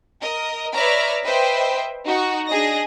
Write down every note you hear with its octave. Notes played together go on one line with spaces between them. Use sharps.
A#4 D#5
B4 C#5 D5 E5 A#5 F6
B4 C5 D#5 E5 G5
D#4 F#4
D4 G#4 D#5 A#6